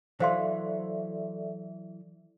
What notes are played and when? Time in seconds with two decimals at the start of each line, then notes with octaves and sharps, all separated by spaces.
0.20 E3 F#3 A4 C5 D5 E5 F5 C6